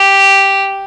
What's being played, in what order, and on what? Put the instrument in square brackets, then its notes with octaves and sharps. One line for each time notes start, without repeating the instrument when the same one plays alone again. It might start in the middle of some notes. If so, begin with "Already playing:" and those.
Already playing: [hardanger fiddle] G4